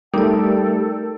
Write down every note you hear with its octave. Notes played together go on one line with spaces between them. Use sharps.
G3 A3 D#4 A4 A#4 D5 G5 E6